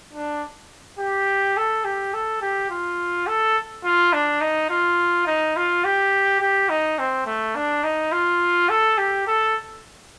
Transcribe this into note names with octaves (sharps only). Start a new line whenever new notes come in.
D4
G4
A4
G4
A4
G4
F4
A4
F4
D4
D#4
F4
D#4
F4
G4
G4
D#4
C4
A3
D4
D#4
F4
A4
G4
A4